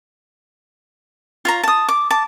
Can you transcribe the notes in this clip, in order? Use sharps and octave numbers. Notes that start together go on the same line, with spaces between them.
F4 C#5 A#5
A5 D#6
D6
A5 D6